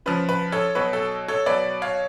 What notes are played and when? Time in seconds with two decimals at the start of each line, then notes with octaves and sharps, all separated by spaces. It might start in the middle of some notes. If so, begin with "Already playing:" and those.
0.06 C#3 F3 B4
0.29 B4
0.52 A4 C#5
0.75 B2 F#3 B4
0.93 A4
1.28 A4 C#5
1.46 B2 F#3 B4 D5
1.82 C#5 F5